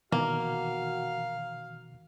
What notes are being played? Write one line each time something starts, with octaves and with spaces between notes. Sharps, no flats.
B2 D#3 E3 A#3 F#4 F5